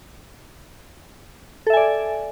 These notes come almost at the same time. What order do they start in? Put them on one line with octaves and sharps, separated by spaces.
A4 E5 G#5 D5